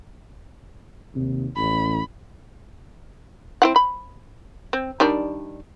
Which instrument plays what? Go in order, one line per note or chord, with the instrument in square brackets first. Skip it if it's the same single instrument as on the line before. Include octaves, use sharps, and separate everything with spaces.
[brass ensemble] D#2 C3
[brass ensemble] A1 [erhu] B5
[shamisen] C4 E4 F#5
B5
C4
D#3 G3 D4